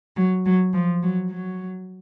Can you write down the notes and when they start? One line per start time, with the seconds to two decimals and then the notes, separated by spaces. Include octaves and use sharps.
0.16 F#3
0.45 F#3
0.74 F3
1.02 F#3
1.30 F#3